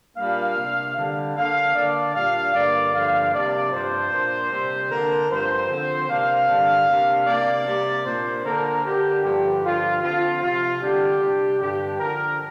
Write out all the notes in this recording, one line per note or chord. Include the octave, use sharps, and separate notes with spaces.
A#2 G3 A#3 D4 F5
C3 A#3 D4
D3 G3 D4
D3 A#3 D4 F5
D3 A#3 D4 D5
A#2 G3 D4 F5
G2 D3 A#3 D5
G2 D3 F3 C4 F5
C3 G3 A#3 D4 D5
G2 F3 D4 C5
A#2 A#3 D4
C3 G3 C4
D3 A#3 D4 A#4
G2 F3 C4 C5
D3 F3 C4
C3 A#3 D4 F5
G2 D3 G3 D4
C3 A#3 D4
C3 A#3 D4 D5
C3 G3 A#3
A#2 A#3 D4 C5
D3 A#3 D4 A#4
D3 A#3 D4 G4
G2 D3 F3 D4 G4
G2 D3 F3 F4
D3 F3 C4 F4
C3 F3 C4 F4
D3 G3 D4 G4
C3 G3 D4
G2 D3 G3 D4 G4
D3 F3 D4 A#4